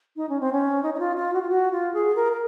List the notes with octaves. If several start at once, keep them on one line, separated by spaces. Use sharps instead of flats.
D#4
C#4
C4
C#4
D#4
D#4
F4
F4
F#4
F4
F#4
F4
G#4
A#4
A#4